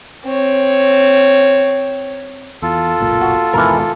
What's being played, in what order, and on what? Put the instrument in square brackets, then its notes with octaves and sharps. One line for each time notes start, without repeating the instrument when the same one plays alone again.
[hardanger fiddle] C4 C#5
[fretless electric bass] E2 [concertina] F4 A4
[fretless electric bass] F#1 B1 A#2
[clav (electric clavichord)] F#4
[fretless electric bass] D#2 G#2 B2 [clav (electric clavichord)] E3 A#4